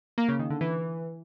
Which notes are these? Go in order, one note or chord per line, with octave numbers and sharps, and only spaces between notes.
A#3
C#3
D#3
D3
E3